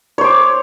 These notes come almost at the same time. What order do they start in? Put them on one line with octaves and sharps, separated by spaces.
C#5 C5 D6